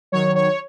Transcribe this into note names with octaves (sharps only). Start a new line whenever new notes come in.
D#3 F#3 C#5
C#5